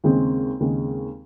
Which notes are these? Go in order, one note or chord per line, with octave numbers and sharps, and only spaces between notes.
D#2 C#3 G#3 C4
D#2 C#3 G#3 C4